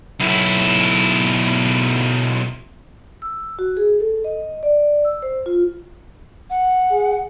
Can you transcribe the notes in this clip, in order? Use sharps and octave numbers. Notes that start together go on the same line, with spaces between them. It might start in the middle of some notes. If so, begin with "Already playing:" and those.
B1 E4
E6
F#4
G#4
A4
D#5
D5
E6
C5
F4
F#5
G#4